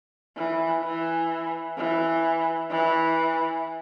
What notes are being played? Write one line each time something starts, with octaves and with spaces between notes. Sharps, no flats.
E3
E3
E3
E3